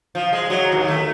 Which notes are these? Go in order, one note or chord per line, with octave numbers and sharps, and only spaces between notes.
F3
G#3
F#3
D#2
A3